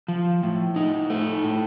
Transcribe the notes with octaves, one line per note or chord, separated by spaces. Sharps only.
F3
A2
D#4
A3
A2